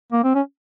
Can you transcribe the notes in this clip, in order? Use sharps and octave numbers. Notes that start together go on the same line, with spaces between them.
A#3
C4
C#4